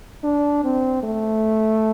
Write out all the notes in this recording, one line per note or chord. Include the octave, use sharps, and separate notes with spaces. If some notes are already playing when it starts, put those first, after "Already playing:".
D4
C4
A3